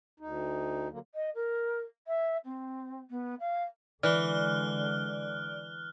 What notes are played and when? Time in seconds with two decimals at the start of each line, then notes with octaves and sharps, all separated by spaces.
0.20 D2 D#4
0.91 D3 F#3 A#3
1.15 D#5
1.35 A#4
2.07 E5
2.45 C4
3.10 B3
3.40 F5
4.03 D3 E3 G#3 D5 F6 F#6 G7